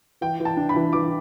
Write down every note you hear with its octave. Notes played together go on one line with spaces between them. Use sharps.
E3 G5
E3
A5
D4
B5
E3
E3 D6